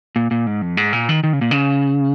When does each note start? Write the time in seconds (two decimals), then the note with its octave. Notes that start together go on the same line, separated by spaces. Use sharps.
0.16 A#2
0.31 A#2
0.47 G#2
0.62 F2
0.77 G#2
0.93 A#2
1.09 D#3
1.24 D#3
1.33 C#3
1.41 A#2
1.51 C#3